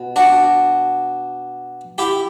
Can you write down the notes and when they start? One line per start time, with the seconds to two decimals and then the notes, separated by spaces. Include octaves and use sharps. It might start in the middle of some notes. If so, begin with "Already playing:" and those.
Already playing: B2
0.16 D4 F#4
1.98 E4 G4